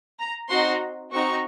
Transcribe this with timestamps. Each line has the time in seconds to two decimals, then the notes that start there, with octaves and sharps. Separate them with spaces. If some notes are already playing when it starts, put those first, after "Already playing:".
0.19 A#5
0.49 C4 D#4 F#4 C6
1.12 C4 D#4 F#4 C#6